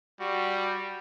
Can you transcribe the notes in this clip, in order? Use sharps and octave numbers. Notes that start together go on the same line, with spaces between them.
G3 F#4